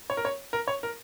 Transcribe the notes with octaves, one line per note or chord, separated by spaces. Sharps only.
C#5
A#4
C#5
A#4
C#5
A#4